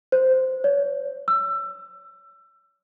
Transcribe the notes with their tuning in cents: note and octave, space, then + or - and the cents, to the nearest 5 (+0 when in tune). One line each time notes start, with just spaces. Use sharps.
C5 -10
C#5 +35
E6 +25